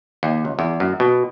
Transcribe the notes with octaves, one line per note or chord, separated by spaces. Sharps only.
D#2
C#2
E2
F#2
B2